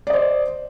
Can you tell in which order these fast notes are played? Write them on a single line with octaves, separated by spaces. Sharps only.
D5 D#5 C5